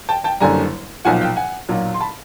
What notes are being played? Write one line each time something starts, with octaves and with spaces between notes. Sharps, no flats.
G5 A5
G5 A5
F#1 F#2 D3 G3 G#5 A#5
B1 A#2 F3 F#5 G#5
F5 G5
F#5 G#5
B1 A#2 F#3
C6
A5 B5